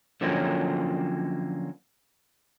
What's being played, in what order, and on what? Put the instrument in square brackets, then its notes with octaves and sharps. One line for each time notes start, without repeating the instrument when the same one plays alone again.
[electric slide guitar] D3 F3 F#3 A#3 C4 C#4